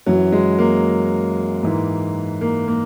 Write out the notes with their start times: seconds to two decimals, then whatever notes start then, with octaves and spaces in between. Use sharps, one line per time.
0.06 F#2 E3 F#3
0.32 G#3
0.59 A#3
1.63 G#2 E3
2.41 A#3
2.68 A#3